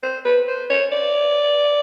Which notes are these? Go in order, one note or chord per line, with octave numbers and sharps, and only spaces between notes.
C5
B4
C5
C#5
D5